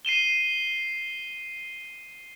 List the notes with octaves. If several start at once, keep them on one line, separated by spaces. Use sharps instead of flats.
C7 D#7 E7 G7